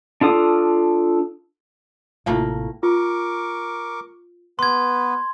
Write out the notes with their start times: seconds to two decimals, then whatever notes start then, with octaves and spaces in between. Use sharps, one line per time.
0.21 D4 F4 A4 D#6
2.26 A1 A2 C3 A3 A#3 E4 F4 F5
2.83 F4 A#4 C#6 D6
4.59 B3 B4 C6 G#6